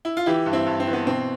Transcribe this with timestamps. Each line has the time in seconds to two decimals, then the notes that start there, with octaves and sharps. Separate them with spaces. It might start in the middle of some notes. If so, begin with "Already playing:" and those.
0.05 E4
0.17 F4
0.26 E3 E4 G4
0.46 G2
0.53 C4 E4
0.66 G2
0.80 C4
0.87 E3
0.93 B3
1.06 B2 C4